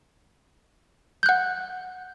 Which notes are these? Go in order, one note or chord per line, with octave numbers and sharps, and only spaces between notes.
F#5 F#6 G6